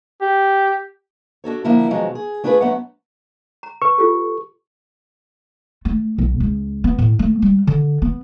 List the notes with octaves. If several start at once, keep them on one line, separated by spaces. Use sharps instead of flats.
G4
D4 F#4 A4 C#5
D3 F3 G3 A#3 D4 E4
B2 D#3 F3 F#3 G#3 C4
G#4
A3 D4 F4 G#4 A4 B4
F#3 A3 B3 B4 F#5
A#5
B4 C#6
F4 G4 A4
A3
B1
C#2
B3
A2
A3
G3
D3
B3